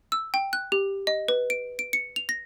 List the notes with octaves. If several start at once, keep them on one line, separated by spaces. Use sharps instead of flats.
E6
G5
F#6
G4
D#5
B4
D7
D7
C#7
F7
A#6